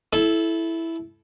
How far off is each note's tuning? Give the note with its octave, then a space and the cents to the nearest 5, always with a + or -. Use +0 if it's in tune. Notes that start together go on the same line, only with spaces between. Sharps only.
E4 +0 A4 -20